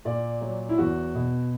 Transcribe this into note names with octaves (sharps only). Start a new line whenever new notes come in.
A#2 D5
F#3
E4
E2 F#4
B2